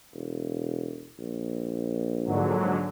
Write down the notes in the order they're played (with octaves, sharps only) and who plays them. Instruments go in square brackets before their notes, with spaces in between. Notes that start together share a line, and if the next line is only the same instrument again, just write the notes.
[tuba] E1
A#1
[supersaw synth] G#2 D3 F#3